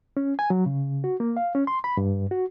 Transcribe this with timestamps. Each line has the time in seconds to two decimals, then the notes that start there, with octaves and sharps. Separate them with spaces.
0.17 C#4
0.39 G#5
0.50 F#3
0.66 C#3
1.04 F#4
1.20 A#3
1.37 F5
1.55 C#4
1.67 C6
1.84 B5
1.97 G2
2.31 F#4